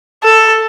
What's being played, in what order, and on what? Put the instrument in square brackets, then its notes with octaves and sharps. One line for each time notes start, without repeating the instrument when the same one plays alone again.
[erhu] A4